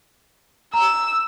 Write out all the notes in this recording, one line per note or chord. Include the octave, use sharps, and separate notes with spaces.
A#5 E6